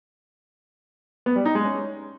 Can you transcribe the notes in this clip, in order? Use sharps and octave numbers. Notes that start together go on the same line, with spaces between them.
B3
G3
D#4
G#3
C#4